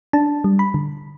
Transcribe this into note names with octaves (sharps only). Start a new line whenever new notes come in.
D4 A5
G3
B5
D3